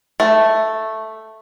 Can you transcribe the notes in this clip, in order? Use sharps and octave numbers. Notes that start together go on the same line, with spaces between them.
A3